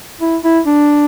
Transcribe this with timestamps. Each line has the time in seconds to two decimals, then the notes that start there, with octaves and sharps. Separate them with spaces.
0.21 E4
0.44 E4
0.66 D4